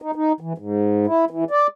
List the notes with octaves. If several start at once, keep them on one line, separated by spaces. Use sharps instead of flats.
D#4
D#4
E3
G#2
E4
E3
D5